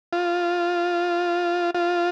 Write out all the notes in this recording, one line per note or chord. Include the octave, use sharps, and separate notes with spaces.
F4
F4